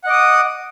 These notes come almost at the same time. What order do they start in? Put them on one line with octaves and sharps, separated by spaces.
F#5 D#5 D6 D#6